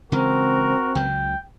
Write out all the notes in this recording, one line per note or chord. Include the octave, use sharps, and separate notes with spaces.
C#3 E3 G#3 C4 F#4 A#4
C#2 C#3 F#3 G5